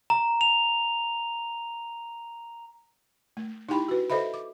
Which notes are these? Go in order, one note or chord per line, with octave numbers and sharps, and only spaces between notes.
A#5
F7
A3
D#4 E4 G4 G5 B5
F#4 B4
A4 C5 D#5 E5 B5
D6